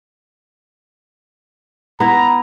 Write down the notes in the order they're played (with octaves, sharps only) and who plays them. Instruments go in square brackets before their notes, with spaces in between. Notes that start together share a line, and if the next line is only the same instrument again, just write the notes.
[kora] B3 E4 [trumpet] A#5